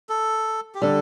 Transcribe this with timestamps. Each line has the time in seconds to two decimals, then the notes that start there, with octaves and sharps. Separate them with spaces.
0.09 A4
0.75 G4
0.82 D3 G3 A4